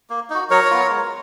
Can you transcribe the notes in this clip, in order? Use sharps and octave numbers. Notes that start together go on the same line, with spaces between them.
A#3
D#4 F#4
F#3 A#4 C#5
B3 F4
G#3